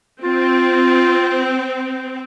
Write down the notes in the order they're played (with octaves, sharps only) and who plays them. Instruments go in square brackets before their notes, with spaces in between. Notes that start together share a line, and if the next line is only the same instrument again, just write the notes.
[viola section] C4 [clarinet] F4